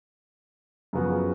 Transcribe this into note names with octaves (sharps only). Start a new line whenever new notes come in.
F#2 C#3 F3 B3 F#4